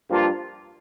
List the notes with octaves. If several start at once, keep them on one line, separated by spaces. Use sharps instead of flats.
G2 F3 A#3 F4